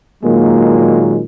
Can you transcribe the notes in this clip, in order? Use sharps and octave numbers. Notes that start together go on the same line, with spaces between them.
A#2 D#3 F#3 G#3 A#3